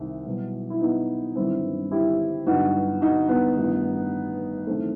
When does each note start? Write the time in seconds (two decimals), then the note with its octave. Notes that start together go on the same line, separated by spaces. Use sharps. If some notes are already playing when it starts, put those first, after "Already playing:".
Already playing: C2 C3 D#3
0.26 C2 B2 F#3
0.70 E4
0.81 B3 D#4
1.35 G1 G2 D#3 F#3 C4 E4
1.91 E4 G4
2.46 G1 G2 F#3 D#4 F#4
3.01 D#4 F#4
3.28 B3 D#4
3.57 A1 G2 D#3
4.67 E2 D#3 F#3 A3 C4